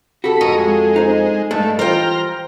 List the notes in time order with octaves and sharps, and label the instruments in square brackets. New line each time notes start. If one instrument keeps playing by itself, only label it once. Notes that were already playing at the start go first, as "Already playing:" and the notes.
[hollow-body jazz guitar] F#4 G4 A4 [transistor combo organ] B5
[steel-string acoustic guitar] F2 [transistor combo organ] A#5 C#6 D#6
[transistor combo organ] G#3
[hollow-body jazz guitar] D#4 C5
[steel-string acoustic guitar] G2 [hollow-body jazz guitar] G#3 [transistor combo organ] A3
[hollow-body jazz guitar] E3 G3 F4 [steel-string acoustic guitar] C5 G5 [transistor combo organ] A#5 F6